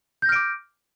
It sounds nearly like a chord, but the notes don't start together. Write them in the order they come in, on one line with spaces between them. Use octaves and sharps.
G6 A#6 F6 D7 D6